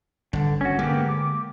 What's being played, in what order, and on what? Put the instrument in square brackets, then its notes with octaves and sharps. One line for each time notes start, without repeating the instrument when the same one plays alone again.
[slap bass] G1 [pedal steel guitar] D3
[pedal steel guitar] C#4 F#4
[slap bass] D3 G#3 [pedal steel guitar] A#3 B3 G4
[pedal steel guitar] D6